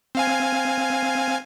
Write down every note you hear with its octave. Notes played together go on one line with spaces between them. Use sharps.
C4 F5 G#5